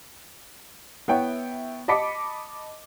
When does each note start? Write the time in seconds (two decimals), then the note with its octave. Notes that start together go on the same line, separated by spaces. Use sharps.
1.08 B3 E4 C#5 G5
1.88 D#5 A5 B5 D6 B6 C#7